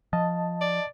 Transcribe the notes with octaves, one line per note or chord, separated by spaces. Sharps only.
F3 D#5 A5
D5